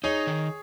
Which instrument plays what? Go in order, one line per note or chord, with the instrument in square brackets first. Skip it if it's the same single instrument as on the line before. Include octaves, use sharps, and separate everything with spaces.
[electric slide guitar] D#4 [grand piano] G#4 C#5
[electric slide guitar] D#3